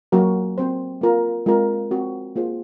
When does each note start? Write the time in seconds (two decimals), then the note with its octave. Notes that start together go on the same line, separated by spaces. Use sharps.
0.12 F#3 A#3 C#4 F#4 A#4
0.58 C4 F#4 C5
1.01 A#3 F4 A#4
1.46 G#3 C4 F4 A#4
1.91 C4 F#4 C5
2.36 A#3 F4 G#4 C5